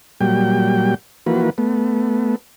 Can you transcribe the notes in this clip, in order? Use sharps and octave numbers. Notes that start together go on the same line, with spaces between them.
A#2 F#3 G3 G5
E3 F3 A#3 F#4 B4
A3 B3